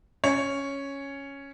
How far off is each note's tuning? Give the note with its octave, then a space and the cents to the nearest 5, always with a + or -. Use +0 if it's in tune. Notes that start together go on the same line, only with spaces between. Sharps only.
C#4 +0 C#5 +0